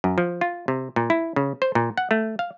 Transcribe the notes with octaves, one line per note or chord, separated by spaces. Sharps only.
F#2
F3
F4
C3
A#2
E4
C#3
C5
A#2
F#5
A3
F5